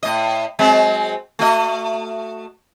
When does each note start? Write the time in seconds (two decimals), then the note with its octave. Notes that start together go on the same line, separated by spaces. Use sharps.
0.03 A2 D#5
0.59 F#3 G#3 C4
1.39 A3 F#4 D#5